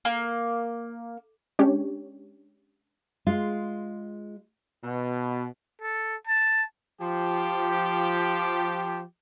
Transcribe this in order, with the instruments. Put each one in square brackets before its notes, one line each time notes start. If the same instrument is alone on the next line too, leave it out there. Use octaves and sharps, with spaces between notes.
[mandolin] A#3
[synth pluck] G#3 C#4 D4 G4 C#5
[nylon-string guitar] G#3 F4
[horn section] B2
[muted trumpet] A4
A5
[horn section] F3 G4